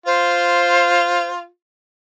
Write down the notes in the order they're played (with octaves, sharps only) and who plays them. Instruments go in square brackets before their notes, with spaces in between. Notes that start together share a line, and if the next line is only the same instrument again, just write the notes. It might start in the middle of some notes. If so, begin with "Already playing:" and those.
[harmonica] F4 [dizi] C5